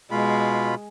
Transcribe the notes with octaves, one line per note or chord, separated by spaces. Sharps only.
B2 G#3 F4 B5